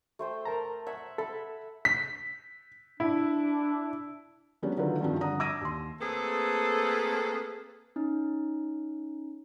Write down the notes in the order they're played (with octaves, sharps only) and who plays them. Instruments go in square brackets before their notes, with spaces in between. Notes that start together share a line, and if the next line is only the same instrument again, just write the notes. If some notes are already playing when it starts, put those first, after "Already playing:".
[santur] A3 C5 G5
[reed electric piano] A#4 A5 A#5
[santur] E5 F#5 G#5
[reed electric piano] A4 [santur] E5 B5
[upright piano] B6
[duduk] D4 [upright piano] E4
[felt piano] F#3 G#3 B3 C#4 D4 G4
D3 D#3 F#3 F4 A4 B4
G2 D#3 F3 G3 C4 F#4
G2 D3 F#5 A#5 D#6
D6 E6 G#6 A#6 D#7
D#2 C6
[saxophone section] A3 A#3 C4 G#4 A4 B4
[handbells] C#4 D#4